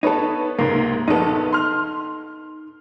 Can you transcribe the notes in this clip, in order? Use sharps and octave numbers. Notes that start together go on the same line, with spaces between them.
B3 D#4 A4 B4 C#5
C#2 G#2 C3 A#3
A#1 B3 D#4 A4
C6 F6